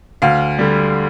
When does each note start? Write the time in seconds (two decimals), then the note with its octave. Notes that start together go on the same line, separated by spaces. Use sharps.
0.22 D2 F5
0.59 D3 G3